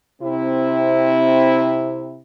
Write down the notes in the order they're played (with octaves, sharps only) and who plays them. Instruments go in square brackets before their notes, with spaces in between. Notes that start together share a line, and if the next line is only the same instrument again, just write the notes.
[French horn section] C3 C4 E4